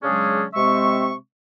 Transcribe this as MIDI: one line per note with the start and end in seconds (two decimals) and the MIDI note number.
0.03 0.45 49
0.03 0.45 54
0.03 0.45 56
0.03 0.45 61
0.03 0.45 62
0.03 0.45 68
0.54 1.14 48
0.54 1.14 56
0.54 1.14 60
0.54 1.14 76
0.54 1.14 85